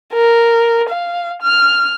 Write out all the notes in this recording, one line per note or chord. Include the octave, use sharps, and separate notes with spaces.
A#4
F5
F6